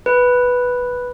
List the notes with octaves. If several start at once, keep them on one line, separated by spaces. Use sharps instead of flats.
B4